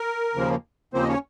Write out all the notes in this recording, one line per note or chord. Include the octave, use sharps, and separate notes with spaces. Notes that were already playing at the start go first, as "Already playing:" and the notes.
Already playing: A#4
D#2 C#3 F3 A#3
D#2 C#3 F3 A#3 C4 C5
D#5
C#4 C#5